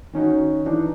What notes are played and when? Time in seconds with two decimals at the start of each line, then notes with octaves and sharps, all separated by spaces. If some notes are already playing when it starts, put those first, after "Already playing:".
0.13 D#3 C#4 D#4 F#4
0.66 E3 D4 D#4